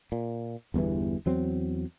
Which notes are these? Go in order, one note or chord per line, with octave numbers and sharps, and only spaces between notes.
A#2
G1 E2 G2 E3
E2 F#3 C4